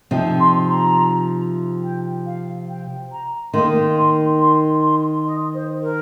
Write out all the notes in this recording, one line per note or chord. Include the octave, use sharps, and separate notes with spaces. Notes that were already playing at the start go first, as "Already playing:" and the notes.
C3 F3 D#4 G5
C6
A#5
G5
F5
G5
A#5
D#3 A#3 D#4 C6
C6
C6
C6
D#5
C5
A#4